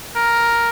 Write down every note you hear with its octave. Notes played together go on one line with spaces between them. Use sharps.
A#4